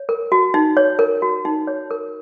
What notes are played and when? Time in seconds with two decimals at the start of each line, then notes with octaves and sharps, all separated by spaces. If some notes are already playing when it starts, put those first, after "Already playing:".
Already playing: C#5
0.09 A#4
0.32 F#4
0.54 D#4
0.77 C#5
0.99 A#4
1.22 F#4
1.45 D#4
1.67 C#5
1.91 A#4